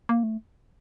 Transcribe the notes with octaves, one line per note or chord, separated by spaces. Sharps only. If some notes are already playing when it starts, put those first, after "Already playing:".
A#3
A3